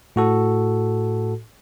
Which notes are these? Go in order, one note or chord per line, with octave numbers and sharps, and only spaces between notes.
A2 F#4 A4